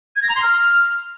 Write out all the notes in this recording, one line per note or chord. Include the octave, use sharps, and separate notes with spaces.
G#6
A#6
A#5
C6
F6